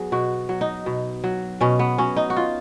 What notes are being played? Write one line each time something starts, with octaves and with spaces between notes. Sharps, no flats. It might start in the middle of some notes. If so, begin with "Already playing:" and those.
Already playing: F#3 B3 G#4
B2 F#4
F#3
D#4
B2
F#3
B2 C#4
B3
F#3 C#4
D#4
F#4
F4